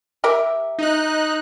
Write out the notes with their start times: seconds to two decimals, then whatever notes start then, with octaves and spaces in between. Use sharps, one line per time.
0.24 G4 A#4 E5
0.79 D#4 F#6